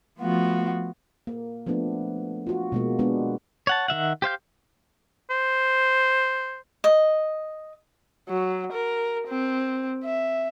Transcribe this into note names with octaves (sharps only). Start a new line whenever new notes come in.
F3 A3 B3 F4 F#4
A#3
F3 A3 B3 D4
F4 F#4
B2 G#3 A#3
G#3 B3 D4
C#5 F#5 A5
D#3 F3 E5 F#5
G4 C5 F5 G6
C5
D#5
F#3
A#4
C4
E5